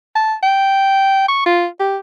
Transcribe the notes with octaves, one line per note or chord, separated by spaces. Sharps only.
A5
G5
C#6
F4
G4